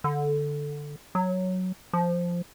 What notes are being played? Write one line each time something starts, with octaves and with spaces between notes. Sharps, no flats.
D3
F#3
F3